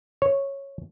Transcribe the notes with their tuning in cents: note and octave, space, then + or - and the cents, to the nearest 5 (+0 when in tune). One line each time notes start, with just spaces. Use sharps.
C#5 -5